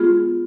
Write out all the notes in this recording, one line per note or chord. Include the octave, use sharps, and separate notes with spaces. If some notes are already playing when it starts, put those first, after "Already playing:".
Already playing: G#3 B3 F4 G#4